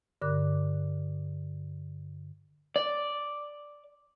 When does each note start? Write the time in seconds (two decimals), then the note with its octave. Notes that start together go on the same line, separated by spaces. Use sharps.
0.22 G2 D3 A#4 D6 F#6
2.76 D5